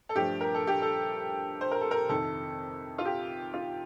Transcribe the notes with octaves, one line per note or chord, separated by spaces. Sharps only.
A4
G2 F3 A3 D4 G4
A#4
A4
G4
A4
C5
A#4
A4
A#4
F2 C3 D#3 A4
F4
G4
F4